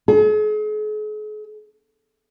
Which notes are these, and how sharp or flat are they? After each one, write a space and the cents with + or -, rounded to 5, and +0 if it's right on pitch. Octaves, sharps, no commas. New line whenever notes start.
G#4 +45